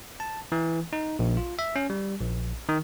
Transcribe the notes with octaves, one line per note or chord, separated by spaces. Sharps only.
A5
E3
D#4
A#1
F4
E5
C#4
G3
A#1
D#3